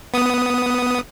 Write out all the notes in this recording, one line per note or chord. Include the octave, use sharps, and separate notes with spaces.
B3 D#6